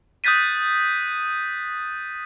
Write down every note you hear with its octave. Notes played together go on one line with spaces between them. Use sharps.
D#6 F#6 G6 A6 B6 D#7